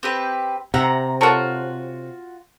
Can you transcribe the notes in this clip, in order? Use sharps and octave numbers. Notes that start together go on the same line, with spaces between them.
C4 G4 B4
C3 E5 F#5 A#5
F4 F#4 A4 A#4 C#5